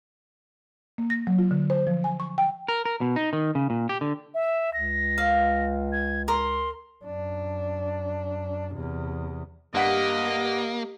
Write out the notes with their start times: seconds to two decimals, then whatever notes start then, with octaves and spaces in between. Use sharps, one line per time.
0.98 A#3
1.10 A#6
1.27 F#3
1.39 F4
1.51 D3
1.70 C5
1.87 F3
2.04 G#5
2.20 C#6
2.38 G5
2.68 A#4
2.85 A#4
3.01 B2
3.16 D#4
3.33 D#3
3.55 C#3
3.70 A#2
3.89 G4
4.01 D3
4.34 E5
4.74 C#2 A#6
5.18 F5
5.92 G#6
6.28 A#4 C6
7.04 F#2 D4
8.75 E2 C3
9.75 G2 A#3 G4 D#5 F#5 B6